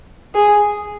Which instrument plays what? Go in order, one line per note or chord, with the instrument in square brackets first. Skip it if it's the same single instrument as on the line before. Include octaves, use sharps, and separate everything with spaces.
[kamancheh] G#4